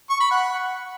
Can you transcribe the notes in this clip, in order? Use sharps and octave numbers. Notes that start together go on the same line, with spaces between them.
C#6
B5
F#5